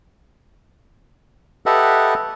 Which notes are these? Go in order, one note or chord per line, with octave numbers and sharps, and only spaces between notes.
G4 A4 B4 D#5 E5 F#5